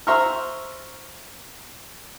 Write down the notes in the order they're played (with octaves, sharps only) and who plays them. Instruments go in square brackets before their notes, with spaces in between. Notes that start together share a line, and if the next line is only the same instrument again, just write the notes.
[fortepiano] C5 E5 A#5 C6 C#6 F6